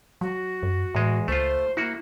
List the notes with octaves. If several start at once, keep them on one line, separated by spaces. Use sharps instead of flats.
F#3 F#4
F#2
E2 A2 G#3
C#2 A3 F4 C5
A#3 E4 F#4